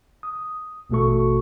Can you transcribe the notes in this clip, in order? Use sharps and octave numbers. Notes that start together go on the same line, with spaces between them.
D#6
A1 B2 A3 F#4 A4 C#6